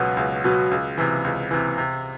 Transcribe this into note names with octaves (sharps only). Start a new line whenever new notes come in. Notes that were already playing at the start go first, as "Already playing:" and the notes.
Already playing: C#2 B2 F#3 B3
C#2
B2 F#3 B3
C#2
C3 E3
C#2
C3 E3
C3